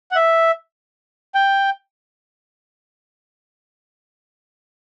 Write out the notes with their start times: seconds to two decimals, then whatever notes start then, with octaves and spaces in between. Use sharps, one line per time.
0.11 F#5
0.16 E5
1.35 G5